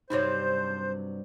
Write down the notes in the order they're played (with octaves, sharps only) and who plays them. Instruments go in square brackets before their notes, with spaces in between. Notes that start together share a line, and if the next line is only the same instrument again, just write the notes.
[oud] G2 C3 F#3 [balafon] D#4 C#5 [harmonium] C5